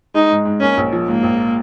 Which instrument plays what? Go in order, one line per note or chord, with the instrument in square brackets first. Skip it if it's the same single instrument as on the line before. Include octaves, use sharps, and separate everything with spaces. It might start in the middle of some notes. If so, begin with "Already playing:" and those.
[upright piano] G#3 [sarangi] D#4
[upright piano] G#2
G#2
[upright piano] A#3 [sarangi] C#4
[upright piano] A#1
F3
[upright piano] G#2 [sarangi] A#3
[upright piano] A#1